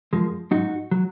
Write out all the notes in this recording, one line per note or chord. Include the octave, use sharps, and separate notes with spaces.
F#2 F3 G#3
G#2 F#3 D#4 F#4
F#3